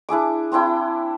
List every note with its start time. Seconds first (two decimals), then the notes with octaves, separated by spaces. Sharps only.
0.09 D4 E4 G#4 D6
0.52 C4 D4 E4 G5